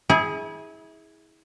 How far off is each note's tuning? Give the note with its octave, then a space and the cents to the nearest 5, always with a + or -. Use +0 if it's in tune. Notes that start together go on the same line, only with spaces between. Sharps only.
E4 -30 G#4 +0